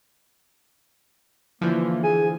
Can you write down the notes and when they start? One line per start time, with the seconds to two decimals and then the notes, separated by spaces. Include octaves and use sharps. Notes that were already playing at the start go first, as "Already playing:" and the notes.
1.61 D3 E3 F3 A#3
2.04 G#4 G#5